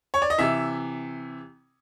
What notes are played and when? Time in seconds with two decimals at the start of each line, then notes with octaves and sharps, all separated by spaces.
0.14 C#5
0.22 D5
0.30 D#5
0.38 C3 E3 E5